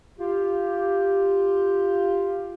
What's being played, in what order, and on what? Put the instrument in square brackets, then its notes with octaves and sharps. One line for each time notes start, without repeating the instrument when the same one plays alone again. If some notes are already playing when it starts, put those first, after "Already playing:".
[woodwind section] F4 G4